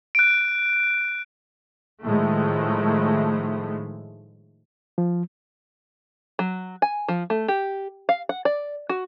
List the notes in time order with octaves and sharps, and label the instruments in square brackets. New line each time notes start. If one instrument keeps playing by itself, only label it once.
[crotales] F#6 D7
[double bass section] A2 D#3 F3 G#3 A3
[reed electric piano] F3
[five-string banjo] F#3
G#5
F3
A3
G4
F5
F#5
D5
F#4